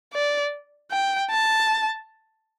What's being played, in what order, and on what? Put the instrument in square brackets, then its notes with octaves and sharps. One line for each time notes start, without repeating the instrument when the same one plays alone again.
[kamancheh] D5
G5
A5